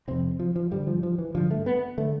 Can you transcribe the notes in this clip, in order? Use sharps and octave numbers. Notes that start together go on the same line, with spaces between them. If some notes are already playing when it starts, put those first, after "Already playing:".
F2 C3 C4
F3
F3
G2 D3 G3
F3
F3
E3
G2 D3 F3
A3
B3
D3 A3